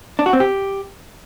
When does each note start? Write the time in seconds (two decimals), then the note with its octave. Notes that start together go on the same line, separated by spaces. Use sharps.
0.19 D4
0.26 F#4
0.33 C4
0.40 G4